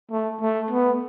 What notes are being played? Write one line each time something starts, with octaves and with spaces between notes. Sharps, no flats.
A3
A3
B3